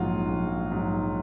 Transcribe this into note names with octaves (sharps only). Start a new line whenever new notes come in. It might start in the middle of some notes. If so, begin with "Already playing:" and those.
Already playing: A#1 G#2 F#3 F4 F#4
A#1
G#2 F#3